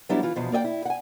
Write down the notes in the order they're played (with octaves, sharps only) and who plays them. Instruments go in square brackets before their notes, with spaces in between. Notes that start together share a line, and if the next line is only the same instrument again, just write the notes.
[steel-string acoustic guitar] F#3 G3 B3 D4 E4 G4
E3 F4
E2 B2 F3
A#3 D5 D#5 G5
E4
F#5 G#5